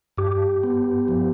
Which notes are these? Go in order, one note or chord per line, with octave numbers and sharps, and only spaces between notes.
G2 G4
B3
F3